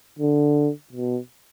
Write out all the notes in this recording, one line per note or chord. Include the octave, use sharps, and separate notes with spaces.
D3
B2